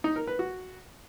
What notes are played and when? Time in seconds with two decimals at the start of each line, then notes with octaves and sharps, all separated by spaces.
0.04 D#4
0.16 A#4
0.27 B4
0.39 F#4